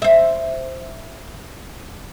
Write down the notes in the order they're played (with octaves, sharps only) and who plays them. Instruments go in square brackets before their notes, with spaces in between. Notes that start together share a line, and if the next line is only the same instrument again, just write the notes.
[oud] C5 E5